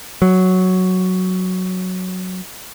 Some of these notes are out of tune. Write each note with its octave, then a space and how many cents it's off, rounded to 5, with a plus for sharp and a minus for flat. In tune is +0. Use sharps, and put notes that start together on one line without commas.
F#3 +0